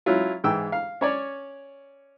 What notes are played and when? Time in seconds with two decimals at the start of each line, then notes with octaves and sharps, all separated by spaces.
0.06 F#3 C#4 E4 F4
0.44 G#2 E3 G5 E6
0.72 F5
1.01 C#4 C#5 D5